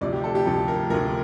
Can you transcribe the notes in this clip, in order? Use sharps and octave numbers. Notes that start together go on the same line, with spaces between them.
D2 C3 F3 D5
G4
A4
G4
D2 C3 F3 A4
A#4
D2 C3 F3 A#4